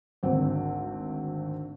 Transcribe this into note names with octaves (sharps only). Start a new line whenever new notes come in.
G#1 D2 C4